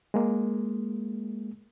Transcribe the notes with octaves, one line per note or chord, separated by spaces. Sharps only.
G#3 A#3